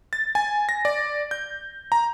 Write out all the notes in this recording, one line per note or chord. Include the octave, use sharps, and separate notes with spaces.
A6
G#5
A#6
D5
G6
A#5